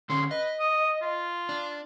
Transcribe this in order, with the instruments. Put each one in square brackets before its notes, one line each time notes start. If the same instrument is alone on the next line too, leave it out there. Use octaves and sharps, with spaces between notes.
[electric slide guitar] D3 C#4 [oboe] C6
[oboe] B4 [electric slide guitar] D#5
[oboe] D#6
F4
[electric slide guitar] D4